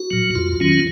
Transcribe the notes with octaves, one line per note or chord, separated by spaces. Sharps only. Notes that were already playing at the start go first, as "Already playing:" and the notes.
Already playing: F#4
A#2 F#3
F2 F4
D#3 F#3 C#4